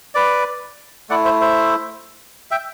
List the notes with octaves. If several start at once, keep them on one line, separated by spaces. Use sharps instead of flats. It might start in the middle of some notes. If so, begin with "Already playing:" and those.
B4 D5
A3 E4 D5 F#5
C5 E5
C5 E5
E5 G5